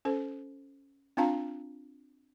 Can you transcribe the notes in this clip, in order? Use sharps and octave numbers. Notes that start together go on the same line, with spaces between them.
C#4 A4 C5
C4 D4 F4 F5 A5 A#5